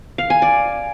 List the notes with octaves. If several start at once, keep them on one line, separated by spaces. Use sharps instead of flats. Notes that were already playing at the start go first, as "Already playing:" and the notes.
F5
G#5
D5